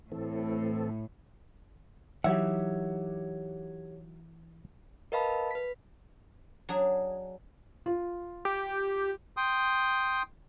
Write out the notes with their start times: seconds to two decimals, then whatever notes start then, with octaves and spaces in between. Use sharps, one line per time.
0.12 A2 E3 C4 A4
2.24 E3 F#3 D#4 G4 C#5 E5 F#5
5.12 A#4 B4 D#5 F5 A5 B5
5.51 B4 B6
6.69 F#3 D4 G#4
7.86 F4
8.45 G4
9.37 G5 C6 D#6